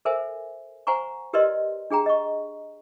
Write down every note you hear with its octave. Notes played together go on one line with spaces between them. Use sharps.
A4 A#4 C5 E5 G#5
C5 F#5 G#5 A#5 C#6
G4 A#4 B4 D5 D#5 C6
D4 G#4 G5 A#5
D#5 C#6